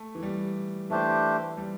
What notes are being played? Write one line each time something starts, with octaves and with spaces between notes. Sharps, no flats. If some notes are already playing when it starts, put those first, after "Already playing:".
Already playing: A3
E3
G3
E3 A3 D4 G4 C5
G3